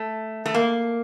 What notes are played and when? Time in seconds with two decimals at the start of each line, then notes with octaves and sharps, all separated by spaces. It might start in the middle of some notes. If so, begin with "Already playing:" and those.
Already playing: A3
0.46 A3
0.54 A#3